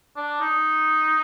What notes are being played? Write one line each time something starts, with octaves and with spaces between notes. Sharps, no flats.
D4
D#4